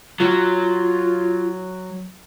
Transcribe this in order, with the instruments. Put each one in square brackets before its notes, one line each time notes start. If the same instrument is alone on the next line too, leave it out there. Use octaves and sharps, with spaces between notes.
[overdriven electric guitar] F#3 [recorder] F4